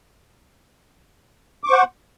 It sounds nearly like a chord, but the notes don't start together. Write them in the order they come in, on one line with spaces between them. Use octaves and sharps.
D6 C#6 C5 F#5